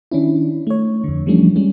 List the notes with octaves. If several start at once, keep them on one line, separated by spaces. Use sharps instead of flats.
D#3 C#4 D4 E4
A3 C#5
F2 D3
E3 F3 G3 A3 C#4 D4
G3 G#3 C#4